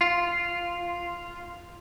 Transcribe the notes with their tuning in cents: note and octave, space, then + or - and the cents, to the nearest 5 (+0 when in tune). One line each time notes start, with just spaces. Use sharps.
F4 -5